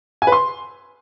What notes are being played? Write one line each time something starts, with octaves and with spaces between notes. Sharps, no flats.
G#5
B4
C6